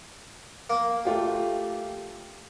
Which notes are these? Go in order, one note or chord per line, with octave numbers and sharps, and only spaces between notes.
A#3
A3 F4 G4